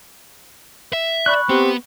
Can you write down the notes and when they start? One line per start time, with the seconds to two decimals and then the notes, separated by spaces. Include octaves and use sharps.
0.93 E5
1.26 D5 B5 C#6 F#6
1.49 B3 C4 G4